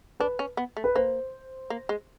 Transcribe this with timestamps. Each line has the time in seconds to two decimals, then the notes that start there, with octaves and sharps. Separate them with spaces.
0.20 D4 B4
0.39 C#4
0.57 B3
0.77 A3
0.84 B4
0.96 A#3 C5
1.70 A#3
1.89 G#3